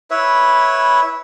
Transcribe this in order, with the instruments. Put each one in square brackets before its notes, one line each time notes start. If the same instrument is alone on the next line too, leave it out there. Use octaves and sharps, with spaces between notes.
[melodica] E4 B4 C#5 E5